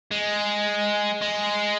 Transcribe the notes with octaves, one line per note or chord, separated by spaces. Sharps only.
G#3
G#3